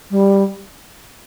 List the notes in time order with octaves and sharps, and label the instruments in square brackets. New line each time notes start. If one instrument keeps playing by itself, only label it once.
[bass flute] G3